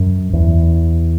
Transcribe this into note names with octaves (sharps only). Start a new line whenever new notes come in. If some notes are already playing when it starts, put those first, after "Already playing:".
Already playing: F#2
E2